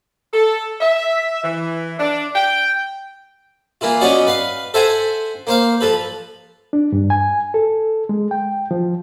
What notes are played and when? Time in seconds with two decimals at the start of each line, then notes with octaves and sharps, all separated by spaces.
0.33 A4
0.81 E5
1.43 E3
1.99 D4
2.35 G5
3.81 E3 A#3 E4 F4
4.01 F#3 B3 C#4 F#4 D5 D#5
4.27 B4 F5
4.74 A4 C5 E5 F#5 G#5
5.47 A#3 C5 F5
5.81 F3 A4 B4
6.73 D4
6.92 G2
7.10 G#5
7.54 A4
8.09 G#3
8.31 G5
8.71 F3